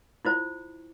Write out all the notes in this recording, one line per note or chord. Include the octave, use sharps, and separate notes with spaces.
E4 F4 C5